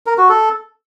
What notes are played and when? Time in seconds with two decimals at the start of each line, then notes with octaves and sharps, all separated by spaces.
0.06 A#4
0.18 F#4
0.29 A4